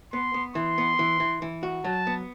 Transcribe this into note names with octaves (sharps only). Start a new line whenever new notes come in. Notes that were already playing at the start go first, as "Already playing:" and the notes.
B3 C6
B3
E3 C6
B3
E3
E3
E3
F#4
F#3 A5
B3